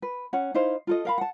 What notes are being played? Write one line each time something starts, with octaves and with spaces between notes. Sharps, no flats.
B4
C#4 F#5
D#4 E4 C5 F5
F4 A4 D#5
A#4 F5 B5
F#5 A5